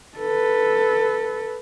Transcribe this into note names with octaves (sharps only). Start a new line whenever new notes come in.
A4 B4